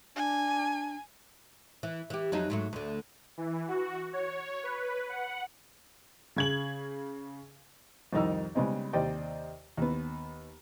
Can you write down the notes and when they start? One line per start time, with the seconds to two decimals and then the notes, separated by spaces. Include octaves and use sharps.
0.16 D4 G#5
1.83 E3
2.10 E3 G4
2.32 F2 F#3 D#4
2.50 G#2 F#3 A3
2.73 D2 D3
3.37 E3
3.68 F#4
4.13 C#5
4.63 B4
5.09 F#5
6.36 C#3 G#6 F#7
8.13 C2 F2 D#3 D#4 A#4 E6
8.55 C#3 G3 G#3 B3 C4 D#4
8.93 D#2 C3 C5 D5 D#5 G5
9.77 D#2 B3